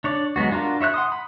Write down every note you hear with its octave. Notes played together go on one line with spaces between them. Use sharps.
D4 C#5 D5
F#3 G#3 B3 F#4
D4 F4 F#4 A#4
E4 C#5 E5 F#6
F#5 C6 D#6
B5